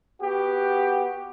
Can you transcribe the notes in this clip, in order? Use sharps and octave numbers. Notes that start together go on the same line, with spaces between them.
B3 F#4 G4